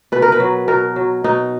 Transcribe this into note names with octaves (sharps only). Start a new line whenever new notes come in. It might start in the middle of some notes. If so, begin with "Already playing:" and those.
B2 B4
A#4
B4
F#3
B2 A#4
F#3
B2 D#4